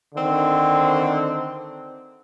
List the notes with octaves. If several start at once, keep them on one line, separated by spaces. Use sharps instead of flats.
D3 D#3 C4